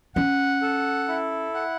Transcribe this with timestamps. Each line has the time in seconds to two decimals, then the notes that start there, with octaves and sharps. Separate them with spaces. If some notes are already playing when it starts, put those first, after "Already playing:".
0.15 C#4 F#5
0.62 A4
1.08 E4
1.54 F#5